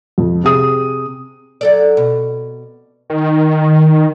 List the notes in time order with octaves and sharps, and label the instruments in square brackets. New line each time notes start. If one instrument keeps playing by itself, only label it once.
[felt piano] F2
C3 G#4 D#6
[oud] F#3 A4 D5
B2
[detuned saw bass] D#3